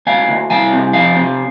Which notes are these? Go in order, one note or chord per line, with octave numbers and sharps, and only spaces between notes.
D2 F5 G#5
D2
C2 F5 G#5
C3
F2 F5 G#5
C3